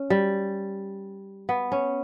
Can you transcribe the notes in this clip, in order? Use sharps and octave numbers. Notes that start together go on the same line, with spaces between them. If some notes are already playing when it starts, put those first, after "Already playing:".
Already playing: C#4
G3
B3
C#4